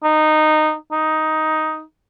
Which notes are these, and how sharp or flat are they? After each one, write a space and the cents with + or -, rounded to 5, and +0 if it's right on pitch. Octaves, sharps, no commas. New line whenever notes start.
D#4 -15
D#4 +10